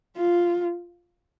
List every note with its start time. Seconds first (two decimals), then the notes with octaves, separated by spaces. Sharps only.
0.17 F4